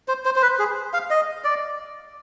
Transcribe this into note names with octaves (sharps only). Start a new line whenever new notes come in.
C5
C5
C5
B4
G#4
F5
D#5
D5